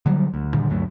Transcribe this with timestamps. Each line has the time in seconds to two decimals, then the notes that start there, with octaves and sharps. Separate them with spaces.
0.06 D3 F#3 G3
0.34 D2
0.54 G2 A#2 D3 D#3
0.70 D2 G2 F#3 A3